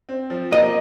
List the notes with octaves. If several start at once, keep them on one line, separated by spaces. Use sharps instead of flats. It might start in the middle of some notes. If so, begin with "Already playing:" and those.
C4
F3
A#3 D#5